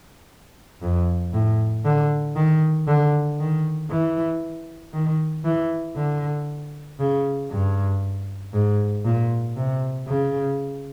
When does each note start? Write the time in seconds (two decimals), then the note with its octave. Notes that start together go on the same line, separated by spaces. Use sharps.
0.82 F2
1.33 A2
1.85 D3
2.36 D#3
2.88 D3
3.39 D#3
3.90 E3
4.93 D#3
5.45 E3
5.96 D3
7.00 C#3
7.51 G2
8.53 G#2
9.05 A#2
9.56 C3
10.08 C#3